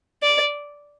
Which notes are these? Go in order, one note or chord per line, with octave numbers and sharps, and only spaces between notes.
D5